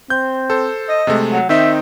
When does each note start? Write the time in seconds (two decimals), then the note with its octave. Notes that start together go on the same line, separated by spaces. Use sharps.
0.10 C4 G6
0.50 A4 C5
0.89 D#5
1.07 C3 G#3 A3
1.31 F#3
1.49 D#3 C4 D#4 E5